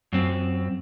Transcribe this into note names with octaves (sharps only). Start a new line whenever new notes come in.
F#2 C4